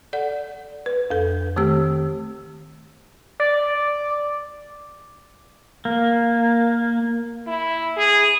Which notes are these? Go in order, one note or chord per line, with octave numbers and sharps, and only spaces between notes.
A4 D5 F#5
B4
F2 A4
D#3 A3 C4 G4 E6
D5
A#3
E4
G#4